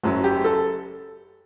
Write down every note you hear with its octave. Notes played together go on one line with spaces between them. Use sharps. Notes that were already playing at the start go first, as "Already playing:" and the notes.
F#1 F#2 F#3
G4
A4